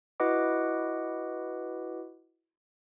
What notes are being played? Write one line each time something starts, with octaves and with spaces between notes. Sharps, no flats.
E4 F#4 B4 D#5 F#5 D6